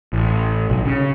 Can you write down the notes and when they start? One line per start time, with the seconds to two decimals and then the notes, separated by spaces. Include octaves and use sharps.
0.13 A1
0.70 B1
0.86 C#3